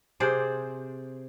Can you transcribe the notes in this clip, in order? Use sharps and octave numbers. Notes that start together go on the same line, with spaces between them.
C3 G#4 C5 D5